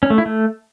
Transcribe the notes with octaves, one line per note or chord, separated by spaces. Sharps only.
C#4
A3
E4
A3